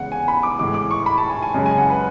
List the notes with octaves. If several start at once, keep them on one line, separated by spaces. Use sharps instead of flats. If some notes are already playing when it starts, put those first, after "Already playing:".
Already playing: E2 C#3 G#3 F#5
G#5
B5
D6
A2 E3 G#3 D6
D6
C#6
B5
A5
G#5
G#5
F#2 C#3 G#3
G#5
F#5
B4